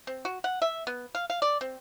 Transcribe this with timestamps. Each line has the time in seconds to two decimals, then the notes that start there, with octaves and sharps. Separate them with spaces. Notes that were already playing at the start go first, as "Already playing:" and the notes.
0.07 C4
0.25 F#4
0.44 F#5
0.62 E5
0.87 B3
1.15 F5
1.30 F5
1.42 D5
1.61 C4